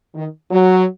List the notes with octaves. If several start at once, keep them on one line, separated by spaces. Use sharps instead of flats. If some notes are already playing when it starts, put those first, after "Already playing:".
D#3
F#3